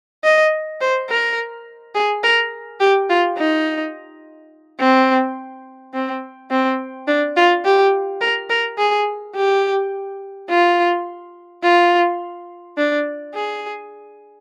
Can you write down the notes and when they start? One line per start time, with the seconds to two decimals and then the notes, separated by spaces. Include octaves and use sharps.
0.24 D#5
0.81 C5
1.10 A#4
1.95 G#4
2.24 A#4
2.80 G4
3.09 F4
3.38 D#4
4.79 C4
5.94 C4
6.51 C4
7.08 D4
7.36 F4
7.65 G4
8.21 A#4
8.50 A#4
8.78 G#4
9.36 G4
10.49 F4
11.63 F4
12.77 D4
13.35 G#4